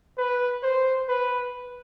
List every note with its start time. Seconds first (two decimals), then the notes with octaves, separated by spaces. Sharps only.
0.18 B4
0.63 C5
1.09 B4